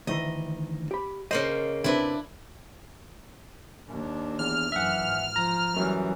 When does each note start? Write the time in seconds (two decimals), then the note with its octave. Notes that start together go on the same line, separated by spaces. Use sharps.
0.07 D2 D#3 E3 D#5
0.91 G4 B5
1.31 C#3 A#3 C5 D#5
1.84 C3 C4 D4 E4 B4
3.89 D#2 D4
4.39 E2 F6
4.72 F#2 E3 E5 F#5
5.04 G#1
5.36 F3 A#5
5.76 F#2 E3 F#3 G3